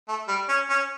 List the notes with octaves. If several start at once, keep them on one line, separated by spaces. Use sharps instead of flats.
A3
G3
C#4
C#4